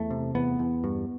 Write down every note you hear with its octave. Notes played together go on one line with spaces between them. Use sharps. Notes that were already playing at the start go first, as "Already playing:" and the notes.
Already playing: E2 A3
C3
E2 B3
E2
G2